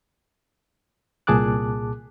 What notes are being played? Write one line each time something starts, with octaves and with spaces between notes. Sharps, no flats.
C2 A#2 G#4 A5 D6 F#6